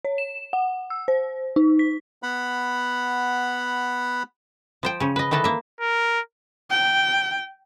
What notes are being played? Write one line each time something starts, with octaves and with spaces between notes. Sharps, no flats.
C#5
E7
F#5
E6
C5
D#4
B6
B3 F#5 B5
F3 C5 G5
C#3 C#4
B4 D#5
D#3 E3 A4 B4 D#5
A#3 E5
A#4
G5